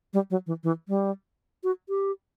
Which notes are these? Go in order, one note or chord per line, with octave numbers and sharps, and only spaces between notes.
G3
F#3
E3
E3
G3
F#4
G4